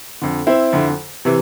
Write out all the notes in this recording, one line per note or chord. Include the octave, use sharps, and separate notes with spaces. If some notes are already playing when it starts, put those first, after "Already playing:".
F2 D3
C4 E4
F2 D3
C3 E3